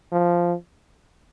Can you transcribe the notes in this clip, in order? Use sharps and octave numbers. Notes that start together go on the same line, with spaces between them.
F3